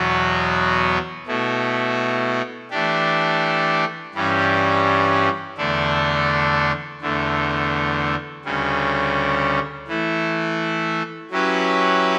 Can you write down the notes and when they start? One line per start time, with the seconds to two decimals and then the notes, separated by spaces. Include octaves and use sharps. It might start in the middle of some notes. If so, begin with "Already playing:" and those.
Already playing: E2 B2 F#3 B3 F#4
1.27 B2 A3 E4
2.70 E3 A3 D4 G4
4.14 G2 E3 G3 C#4 G4
5.58 E2 D3 A3 D4
7.01 E2 D3 A3
8.45 D2 C#3 G3 C#4
9.87 E3 A3 E4
11.31 F#3 C#4 E4 G4 B4